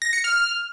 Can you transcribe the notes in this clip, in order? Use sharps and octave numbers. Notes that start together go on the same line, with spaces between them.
A#6
C#7
F6